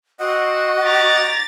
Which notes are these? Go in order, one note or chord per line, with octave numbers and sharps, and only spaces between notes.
C4 F#4 D#5 F#5
G4 D5 A#5 A6